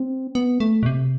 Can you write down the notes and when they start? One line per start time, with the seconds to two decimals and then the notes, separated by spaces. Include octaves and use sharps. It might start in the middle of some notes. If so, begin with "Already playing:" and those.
Already playing: C4
0.35 B3
0.60 A3
0.83 B2
0.86 C3